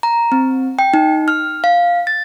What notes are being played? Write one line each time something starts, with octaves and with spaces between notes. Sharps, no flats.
A#5
C4
G5
D#4
F6
F5
A6